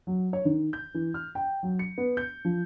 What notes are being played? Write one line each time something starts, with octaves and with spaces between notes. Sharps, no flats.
F#3
C#5
D#3
G6
E3
F6
G5
F#3
C#7
B3
G6
F3